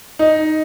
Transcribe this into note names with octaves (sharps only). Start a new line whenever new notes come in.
D#4